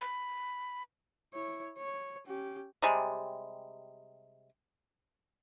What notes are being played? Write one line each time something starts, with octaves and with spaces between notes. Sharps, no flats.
B5
E4 C#5
C#5
C#4 G4
C3 G3 G#3